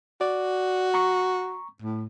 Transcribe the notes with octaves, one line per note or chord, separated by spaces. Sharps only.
F#4 D5
A#5 C#6
A2